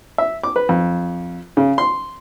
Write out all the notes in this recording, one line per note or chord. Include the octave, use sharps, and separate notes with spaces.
E5
D6
B4
F2
C#3
C6